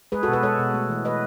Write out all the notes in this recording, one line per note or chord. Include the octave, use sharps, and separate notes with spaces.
G#3 G#4 B4
F#4 A4
B2
G#4 B4
G#3 A4 C#5
B2
A3
E3
E3 B4 D#5